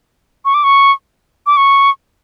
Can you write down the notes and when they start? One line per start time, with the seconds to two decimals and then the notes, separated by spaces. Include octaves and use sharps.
0.45 C#6
0.54 D6
0.64 C#6
1.46 D6
1.57 C#6